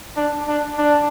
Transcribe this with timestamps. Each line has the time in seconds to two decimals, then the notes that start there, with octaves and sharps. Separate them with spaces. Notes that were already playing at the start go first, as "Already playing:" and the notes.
0.16 D4
0.47 D4
0.78 D4